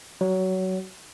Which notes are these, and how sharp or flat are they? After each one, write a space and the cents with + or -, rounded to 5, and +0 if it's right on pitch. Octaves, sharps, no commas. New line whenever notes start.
F#3 +20